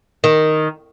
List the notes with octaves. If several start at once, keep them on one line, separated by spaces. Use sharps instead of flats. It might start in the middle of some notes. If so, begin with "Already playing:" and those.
D#3